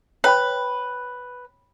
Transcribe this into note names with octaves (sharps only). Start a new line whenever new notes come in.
B4 C#5 G5 B5